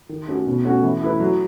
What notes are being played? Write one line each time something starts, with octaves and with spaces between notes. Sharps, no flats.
D#3
A3 C#4 F#4 A4
B2
A3 C#4 F#4
E3
A3 E4 B4
F#3